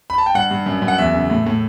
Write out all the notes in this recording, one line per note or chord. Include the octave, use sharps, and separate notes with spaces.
B5
A5
G5
G2 F#5
G2
F#2
F#2
F#5
E2 E5
C#3
A2
A2